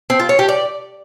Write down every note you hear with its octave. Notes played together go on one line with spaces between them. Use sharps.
C4
F4
C#5
G4
D5